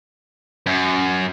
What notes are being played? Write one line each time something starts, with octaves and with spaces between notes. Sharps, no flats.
F#2